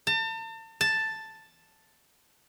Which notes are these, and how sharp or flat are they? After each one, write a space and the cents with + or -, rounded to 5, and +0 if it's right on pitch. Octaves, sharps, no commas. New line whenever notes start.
A5 +40
A5 +5